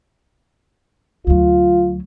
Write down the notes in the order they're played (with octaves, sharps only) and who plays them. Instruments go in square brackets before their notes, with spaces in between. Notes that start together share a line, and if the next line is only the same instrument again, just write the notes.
[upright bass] D2 F#3 [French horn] F4